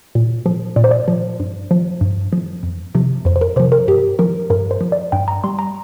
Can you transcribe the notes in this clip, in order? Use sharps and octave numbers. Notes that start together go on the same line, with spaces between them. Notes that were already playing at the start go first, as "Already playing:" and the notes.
A#2
F3
A#2 D5
C5
D5
F3
G2
F3
G2
F3
F2
C3 F3
F2 C5
C5
A#4
C3 F3 C5
A#4
G2 G4
F3 A#4
G2 A#4
C5
F3
D5
G2 G5
A#5
G3 C6
A#5